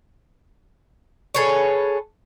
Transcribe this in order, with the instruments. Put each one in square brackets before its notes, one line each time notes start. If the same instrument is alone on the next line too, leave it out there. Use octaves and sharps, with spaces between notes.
[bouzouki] G#4 A4 B4 C#5